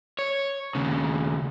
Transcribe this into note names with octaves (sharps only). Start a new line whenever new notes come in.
C#5
D#2 C#3